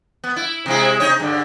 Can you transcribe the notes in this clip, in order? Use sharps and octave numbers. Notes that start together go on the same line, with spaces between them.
B3
E4
C3 G#3 E4
C3 D#4 C#5
G2 D3